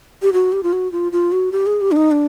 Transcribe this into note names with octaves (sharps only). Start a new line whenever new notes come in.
G4
F#4
G4
F4
F#4
F4
F4
F#4
G4
G#4
G4
D4
D#4
D4